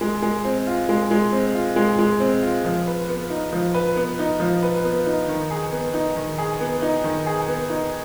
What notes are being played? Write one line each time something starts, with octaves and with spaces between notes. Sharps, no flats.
G#3
G#3
C4
F4
G#3
G#3
C4
F4
G#3
G#3
C4
F4
F3
B4
B3
D#4
F3
B4
B3
D#4
F3
B4
B3
D#4
D#3
G#4
B3
D#4
D#3
G#4
B3
D#4
D#3
G#4
B3
D#4